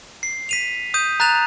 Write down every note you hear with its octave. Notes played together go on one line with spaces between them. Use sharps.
C7
B6 D#7 F7
D#6 G6 D#7
A#5 F#6 A6 E7 F7